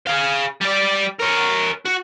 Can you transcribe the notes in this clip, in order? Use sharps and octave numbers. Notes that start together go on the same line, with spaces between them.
G#4 F5
G3 D5
A#4 C#5
F#4